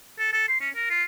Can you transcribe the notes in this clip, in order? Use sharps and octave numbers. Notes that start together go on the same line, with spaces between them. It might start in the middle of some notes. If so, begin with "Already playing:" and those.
A4
A4
C6
C#4
A#4
F4